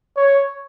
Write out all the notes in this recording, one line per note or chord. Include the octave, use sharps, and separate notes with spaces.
C#5